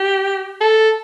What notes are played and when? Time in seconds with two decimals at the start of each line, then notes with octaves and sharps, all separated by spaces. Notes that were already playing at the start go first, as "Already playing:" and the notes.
Already playing: G4
0.61 A4